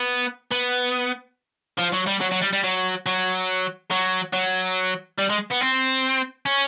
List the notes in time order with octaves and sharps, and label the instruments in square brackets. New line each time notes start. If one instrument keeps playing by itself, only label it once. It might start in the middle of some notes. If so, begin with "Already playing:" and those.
Already playing: [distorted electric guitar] B3
B3
F3
F#3
G3
F#3
F#3
G3
G3
F#3
F#3
F#3
F#3
G3
G#3
B3
C4
C#4